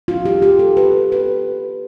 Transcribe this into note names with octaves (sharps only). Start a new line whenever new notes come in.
F4
G4
G4
A4
B4
B4